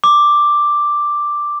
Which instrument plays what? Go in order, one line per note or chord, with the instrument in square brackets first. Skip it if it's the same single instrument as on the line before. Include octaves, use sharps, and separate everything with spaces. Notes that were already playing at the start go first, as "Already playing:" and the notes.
[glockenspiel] D6